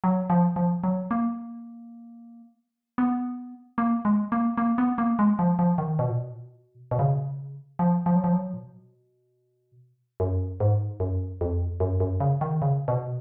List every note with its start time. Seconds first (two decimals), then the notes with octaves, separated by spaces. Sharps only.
0.04 F#3
0.30 F3
0.56 F3
0.84 F#3
1.11 A#3
2.98 B3
3.78 A#3
4.05 G#3
4.32 A#3
4.57 A#3
4.78 B3
4.98 A#3
5.19 G#3
5.39 F3
5.59 F3
5.78 D#3
5.99 B2
6.09 A#2
6.18 B2
6.91 B2
6.99 C#3
7.79 F3
8.06 F3
8.15 F#3
8.24 F3
8.33 F#3
8.53 A#2
8.59 B2
10.20 F#2
10.60 G#2
11.00 F#2
11.41 F2
11.80 F#2
12.00 F#2
12.20 C#3
12.41 D#3
12.62 C#3
12.88 B2